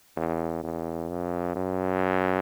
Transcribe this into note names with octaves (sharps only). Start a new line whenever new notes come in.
E2
E2
F2
F#2